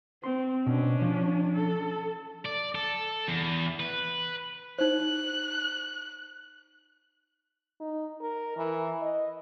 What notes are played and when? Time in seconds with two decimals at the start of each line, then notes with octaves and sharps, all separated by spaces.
0.24 C4 C6
0.66 B2 C#4 D4
1.02 F3
1.56 A4
2.45 D5
2.75 A4
3.28 E2
3.80 B4
4.79 D#4 C5 F#6
7.80 D#4
8.21 A#4
8.57 E3
9.02 D#5